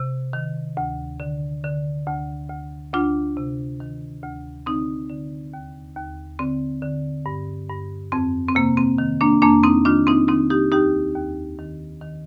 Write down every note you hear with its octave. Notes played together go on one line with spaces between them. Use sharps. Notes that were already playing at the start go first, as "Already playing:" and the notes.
Already playing: C3
D#3
D2
D3
D3
D2
D2
D2 D4 F4
C3
D#3
D2
D3 C4 D#4
D3
D#2
D#2
D3 C4
D3
G2
G2
F2 C4
C4
C3 A#3
C4
D#3
A#3 D4
F2 A#3 D4
C4 D#4
D#3 D4 F4
C4 D#4
D#3 C4 D#4
D#4 G4
D#2 D#4 G4
D#2
D#3
D#3